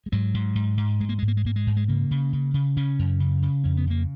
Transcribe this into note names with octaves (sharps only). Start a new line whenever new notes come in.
G#3
G#2 F#3
G#2
G#2
G#2
G#2 G#3
A#3
G#2 G#3
A#3
G#3
G#2 A#3
G#3
G#2
G#3
C#3 A#3
C#3
C#3
C#3
C#3 C#4
F#2
C#3
C#3
F2 C#4
B3
C#3 A#3